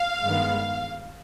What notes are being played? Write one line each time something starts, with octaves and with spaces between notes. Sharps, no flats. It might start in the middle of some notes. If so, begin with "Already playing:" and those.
Already playing: F5
G2 D#3 G#3 B3